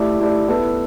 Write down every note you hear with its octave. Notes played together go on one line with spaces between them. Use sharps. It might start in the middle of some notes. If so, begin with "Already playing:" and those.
Already playing: A3 E4 G4 D5
A3 E4 G4 D5
B3 E4 A4